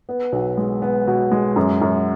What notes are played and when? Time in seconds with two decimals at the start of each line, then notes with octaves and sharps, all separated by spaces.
0.09 B3
0.32 B1
0.57 G#3
0.82 B3
1.07 B2
1.32 G#3
1.56 F#2
1.82 F#2